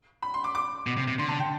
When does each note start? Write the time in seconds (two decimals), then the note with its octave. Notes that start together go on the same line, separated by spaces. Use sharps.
0.22 B5
0.34 C6
0.44 D6
0.55 D6
0.87 B2
0.98 C3
1.08 C3
1.19 D3 C6
1.29 A5
1.40 G5